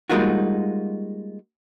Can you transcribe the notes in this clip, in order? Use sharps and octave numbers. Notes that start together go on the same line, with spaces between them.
G3 G#3 A#3 D#4 F4 F#4